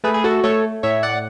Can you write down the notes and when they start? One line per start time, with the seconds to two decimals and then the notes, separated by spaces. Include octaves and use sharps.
0.04 A3 G#4 B4
0.14 G#4
0.24 F#4 A4
0.44 A3 A4 C#5
0.83 A2 C#5 E5
1.03 D5 F#5